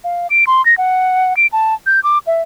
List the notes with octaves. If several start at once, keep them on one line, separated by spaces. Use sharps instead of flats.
F5
D7
C6
A#6
F#5
D7
A5
G6
D6
E5